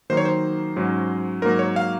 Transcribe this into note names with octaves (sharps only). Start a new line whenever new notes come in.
D#3 F#3 A#3 D#4 C5
C#5
C5
G#2 F#3 C#4
G#2 F#3 A#3 A#4
C#5
F5